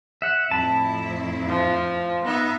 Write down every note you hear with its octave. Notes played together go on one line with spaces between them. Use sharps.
E5 F#5
F2 A2 E4 A5 B5
F3
B3 D#4 E5